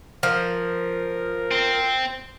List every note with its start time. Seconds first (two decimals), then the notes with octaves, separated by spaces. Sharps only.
0.23 F3 A#4
1.51 C4